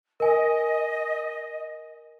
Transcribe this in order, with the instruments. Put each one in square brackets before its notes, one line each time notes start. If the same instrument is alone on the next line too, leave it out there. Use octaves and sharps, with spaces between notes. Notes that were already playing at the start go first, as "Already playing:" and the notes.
[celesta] A#4 G#5 [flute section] D#5